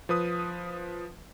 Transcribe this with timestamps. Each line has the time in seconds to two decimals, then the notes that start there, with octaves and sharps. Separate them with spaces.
0.09 F3 B4 D#6